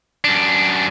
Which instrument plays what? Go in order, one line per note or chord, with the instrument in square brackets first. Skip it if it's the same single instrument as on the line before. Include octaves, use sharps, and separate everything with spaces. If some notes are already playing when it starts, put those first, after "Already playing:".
[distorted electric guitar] F#2 D4